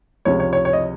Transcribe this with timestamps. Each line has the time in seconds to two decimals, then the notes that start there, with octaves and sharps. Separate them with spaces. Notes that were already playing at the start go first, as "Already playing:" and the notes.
0.25 C#2 C3 F3 C#5
0.40 C#5
0.53 C#5
0.65 C#5
0.73 D#5